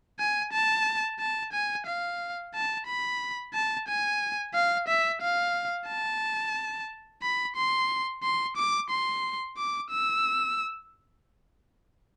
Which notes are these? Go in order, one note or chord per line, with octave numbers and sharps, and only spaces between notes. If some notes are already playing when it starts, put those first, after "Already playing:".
G#5
A5
A5
G#5
F5
A5
B5
A5
G#5
F5
E5
F5
A5
B5
C6
C6
D6
C6
D6
E6